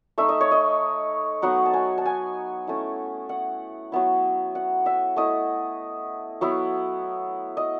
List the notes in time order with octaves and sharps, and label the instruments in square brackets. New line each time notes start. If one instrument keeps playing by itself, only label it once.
[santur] A3 D#4 E5
D#5
C#5
D#5
F#3 B3 D#4 F#5
A5
G#5
A5
G#5
A3 C#4 E4
F#5
F#3 B3 E4
F#5
E5
A3 E4 D#5
F#3 B3 E4
D#5